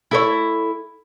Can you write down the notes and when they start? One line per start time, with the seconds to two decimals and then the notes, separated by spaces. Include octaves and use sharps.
0.11 E4 A4 C#5